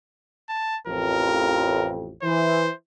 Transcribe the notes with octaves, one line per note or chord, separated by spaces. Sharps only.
A5
A1 F2 A#4
E3 C5